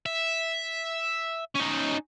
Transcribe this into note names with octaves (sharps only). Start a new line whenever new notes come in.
E5
C#4 D#4